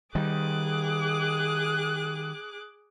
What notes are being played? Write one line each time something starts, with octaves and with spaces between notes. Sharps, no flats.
D#3 G3 G#4 D6 F#6